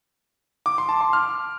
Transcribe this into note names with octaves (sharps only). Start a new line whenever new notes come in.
D6
C6
A5
C6
F6